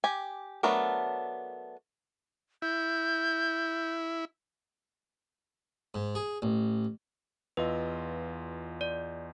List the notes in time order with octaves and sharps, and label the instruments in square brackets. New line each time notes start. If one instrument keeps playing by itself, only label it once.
[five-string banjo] G4 G#5
F#3 A3 B3 D4 A#4
[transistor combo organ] E4 [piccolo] G6
[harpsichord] G#2
G#4
A1
[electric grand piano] E2 F4 D#5 [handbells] B4
[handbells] D5